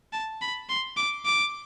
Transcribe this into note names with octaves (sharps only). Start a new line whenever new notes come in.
A5
B5
C6
D6
D6